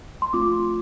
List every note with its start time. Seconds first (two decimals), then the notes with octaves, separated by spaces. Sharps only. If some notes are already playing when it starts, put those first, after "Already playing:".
0.22 C6
0.33 A3 C4 F4 D6